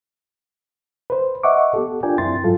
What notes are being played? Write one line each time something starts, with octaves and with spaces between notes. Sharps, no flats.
B4 C5
D#5 E5 F#5 C#6 D6
B3 G4 A4
D4 F4 A#4 D5 G5 G#5
F#2 C4 E4 C6 A6
G#2 F#3 F4 A4